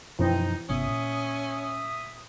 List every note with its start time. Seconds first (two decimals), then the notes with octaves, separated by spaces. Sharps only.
0.19 F#2 B2 E3 F3 C4 D#4
0.69 G1 C3 B3 C#4 E5 D#6
0.88 A#2